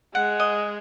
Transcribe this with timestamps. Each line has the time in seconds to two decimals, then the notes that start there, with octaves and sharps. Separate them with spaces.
0.15 G#3 F#5
0.40 D#5